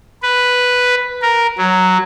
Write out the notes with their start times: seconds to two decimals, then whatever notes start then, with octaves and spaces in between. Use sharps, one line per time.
0.23 B4
1.22 A#4
1.58 F#3